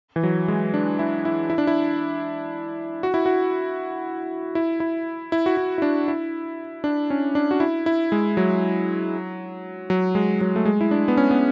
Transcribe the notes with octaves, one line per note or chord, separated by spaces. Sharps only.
E3
F#3
G#3
D4
E4
E4
E4
D4
E4
F#4
E4
F#4
E4
E4
E4
F#4
E4
E4
D4
E4
D4
C#4
D4
F#4
E4
E4
G#3
F#3
F#3
G#3
F#3
A3
G#3
E4
D4
B3
C#4
B3